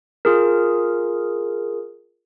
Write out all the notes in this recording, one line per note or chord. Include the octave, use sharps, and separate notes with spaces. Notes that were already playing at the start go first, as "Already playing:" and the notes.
F4 G#4 A#4